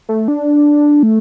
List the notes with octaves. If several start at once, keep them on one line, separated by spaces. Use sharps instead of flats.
A3
D4
A3